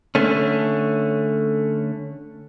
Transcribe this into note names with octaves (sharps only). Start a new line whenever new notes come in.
D3 A3 C#4